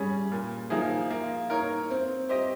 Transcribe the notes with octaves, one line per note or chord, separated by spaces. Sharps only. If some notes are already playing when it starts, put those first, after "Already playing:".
Already playing: G3 C#4 G#4
A#2
F3 A#3 D#4 G#4
A#3
D#4 A#4 C#5
C4
G4 C5 D#5